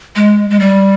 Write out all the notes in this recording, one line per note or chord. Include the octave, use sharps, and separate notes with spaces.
G#3
G#3
G3